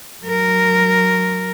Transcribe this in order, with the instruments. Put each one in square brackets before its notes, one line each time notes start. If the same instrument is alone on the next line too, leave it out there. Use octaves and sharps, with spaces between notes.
[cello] F#3 A#4